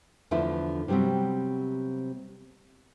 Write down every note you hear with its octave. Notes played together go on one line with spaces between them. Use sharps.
E2 D3 F3 A3 D4 E4
C3 F#3 G3 B3 C4